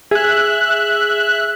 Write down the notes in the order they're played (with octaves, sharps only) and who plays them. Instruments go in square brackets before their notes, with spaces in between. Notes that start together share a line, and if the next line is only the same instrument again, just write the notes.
[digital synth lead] G#4 [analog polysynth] E5 F#6